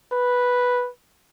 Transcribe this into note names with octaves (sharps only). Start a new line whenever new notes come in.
B4